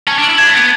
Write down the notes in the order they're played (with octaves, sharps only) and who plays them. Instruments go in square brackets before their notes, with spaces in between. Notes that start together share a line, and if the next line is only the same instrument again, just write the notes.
[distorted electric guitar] C#4 [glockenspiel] A5
[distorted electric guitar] D4
[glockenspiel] D7
[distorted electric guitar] E4
[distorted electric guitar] D4 [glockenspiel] G#6
[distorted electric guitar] A3
[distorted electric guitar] B3 [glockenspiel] D7